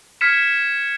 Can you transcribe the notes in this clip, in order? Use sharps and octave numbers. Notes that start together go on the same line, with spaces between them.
F6 G#6 B6 C#7 E7